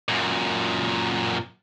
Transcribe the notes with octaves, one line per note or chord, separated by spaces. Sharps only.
F#2 A#2